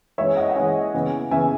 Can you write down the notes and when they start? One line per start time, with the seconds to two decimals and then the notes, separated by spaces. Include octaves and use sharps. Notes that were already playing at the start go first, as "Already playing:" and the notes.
0.18 E3 G#3 C#4 C#5 E5
0.37 D#5 F#5
0.50 F#5
0.56 E3 G#3 C#4 E5 G#5
0.94 C#3 E3 B3
1.31 C#3 E3 B3 E5 G#5